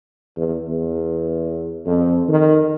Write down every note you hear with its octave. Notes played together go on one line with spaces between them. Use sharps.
E2
E2
F2
D#3